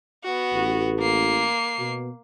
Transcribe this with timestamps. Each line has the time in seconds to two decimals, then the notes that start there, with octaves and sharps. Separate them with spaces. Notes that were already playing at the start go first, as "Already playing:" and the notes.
0.24 B3 F#4
0.54 A1
1.00 A#3 C7
1.79 B2